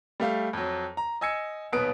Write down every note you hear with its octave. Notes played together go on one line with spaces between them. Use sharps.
G3 A3 F5
F2 F#3
A#5
D#5 G#5 E6 G#6 C#7
D#1 B1 B3 B4 D#6 D7